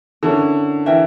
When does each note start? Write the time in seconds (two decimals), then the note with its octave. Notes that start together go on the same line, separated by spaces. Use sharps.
0.23 D3 C#4 E4 A#4
0.86 E3 A#4 E5 G5